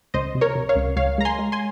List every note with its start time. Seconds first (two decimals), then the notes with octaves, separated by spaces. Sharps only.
0.14 C#2 C5 D#5
0.35 C3
0.41 A#4 C#5
0.55 C3
0.69 C#5 F5
0.76 C#2
0.96 C#2 C#5 F5
1.18 G#3 A#5
1.25 G#5 C6
1.39 G#3
1.52 G#5 C6